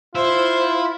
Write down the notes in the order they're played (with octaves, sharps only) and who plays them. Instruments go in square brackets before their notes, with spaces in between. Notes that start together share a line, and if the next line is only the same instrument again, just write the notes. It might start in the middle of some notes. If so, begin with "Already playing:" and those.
[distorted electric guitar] E4 [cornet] F4 [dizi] C5